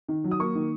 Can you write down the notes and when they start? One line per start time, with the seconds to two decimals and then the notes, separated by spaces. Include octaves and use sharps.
0.09 D#3
0.24 F#3
0.31 D#6
0.40 A#3 C#6
0.55 D#3